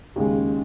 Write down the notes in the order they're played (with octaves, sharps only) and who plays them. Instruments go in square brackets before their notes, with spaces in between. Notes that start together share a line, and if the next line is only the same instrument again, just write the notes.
[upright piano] D#2 C#3 G#3